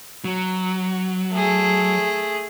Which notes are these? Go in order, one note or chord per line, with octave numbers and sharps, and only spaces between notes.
F#3
A3 G#4